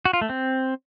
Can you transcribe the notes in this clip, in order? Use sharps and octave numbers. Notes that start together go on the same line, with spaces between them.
F#4
F4
A3
C4